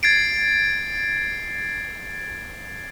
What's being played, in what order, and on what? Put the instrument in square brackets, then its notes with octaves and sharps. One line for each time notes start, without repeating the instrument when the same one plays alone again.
[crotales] G#6 A6 C7 D7